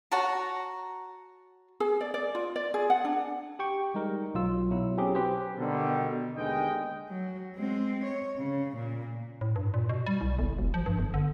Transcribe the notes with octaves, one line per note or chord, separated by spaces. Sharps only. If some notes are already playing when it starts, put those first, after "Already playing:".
F#4 C#5 A5 A#5
G#4
D5
D5
F4
D5
G#4
F#5
D4
G4 G5 C#6
G3 G#3 D#4 A#4
B1 F#3 F4 E6
B2 F#3 E4
F#3 C4 C#4 G4 G#4
G4 B4 C5
B2 D3 D#3 G3
D#2 D3 G#3 B3 D#5 G5
F#3
G#3 C4
C#5
C#3
A#2
A2
G2
A#2
B2
G3
C2
G1
E1
F3
G2
G1
D3